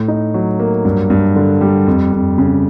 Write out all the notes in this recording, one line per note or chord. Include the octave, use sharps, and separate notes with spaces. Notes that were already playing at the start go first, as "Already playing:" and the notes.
Already playing: A2
D#4
F#3
A#3
G2
G2
D3
G3
F2
F2
C#3